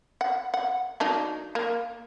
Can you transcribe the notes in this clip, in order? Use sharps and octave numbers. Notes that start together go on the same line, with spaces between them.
F#5
F#5
F#3 D4 D#4
A#3